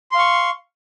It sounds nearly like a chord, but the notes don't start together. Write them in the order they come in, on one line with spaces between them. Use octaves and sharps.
C6 F5 C#6